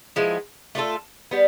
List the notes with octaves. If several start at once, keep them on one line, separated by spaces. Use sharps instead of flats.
F3 G#3 B3 E4
A3 D4 F4 A4
G3 B3